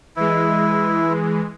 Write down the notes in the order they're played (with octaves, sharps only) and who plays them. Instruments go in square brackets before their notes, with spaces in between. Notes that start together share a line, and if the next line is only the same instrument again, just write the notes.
[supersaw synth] E3 G#3 [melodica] E4